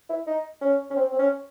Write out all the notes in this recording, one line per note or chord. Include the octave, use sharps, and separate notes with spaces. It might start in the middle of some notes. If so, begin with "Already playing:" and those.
E4
D#4
C#4
C#4
C4
C4
C#4